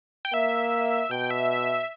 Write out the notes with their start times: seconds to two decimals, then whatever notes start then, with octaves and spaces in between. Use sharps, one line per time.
0.25 G5
0.33 A#3 E5
1.11 B2 G5
1.31 E5